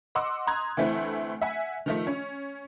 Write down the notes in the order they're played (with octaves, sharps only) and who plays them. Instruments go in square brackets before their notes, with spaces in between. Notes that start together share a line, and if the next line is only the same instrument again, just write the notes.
[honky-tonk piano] D#5 F#5 C6 D6 E6
A#5 C6 D#6 F#6 G#6
D2 E3 A3 C4 E4
E5 F#5 G#5
D#3 F3 A3
C#4